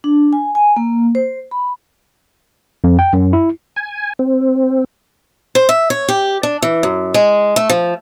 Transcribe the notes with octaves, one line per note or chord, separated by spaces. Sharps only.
D4
G#5
G#5
A#3
C5
B5
F2
G5
F#2
E4
G#5
C4
C5
E5
C#5
G4
D4
E3
F#2
G#3
A3
F3